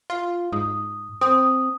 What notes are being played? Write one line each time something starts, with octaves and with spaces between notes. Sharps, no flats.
F4
G#2 D#6
C4 D#6